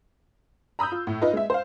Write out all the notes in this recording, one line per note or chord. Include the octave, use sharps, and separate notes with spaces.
A#5 B5 D#6 E6 G6
F4
A2
D#4 F4 B4 D#5
G#3 E5
C5 F5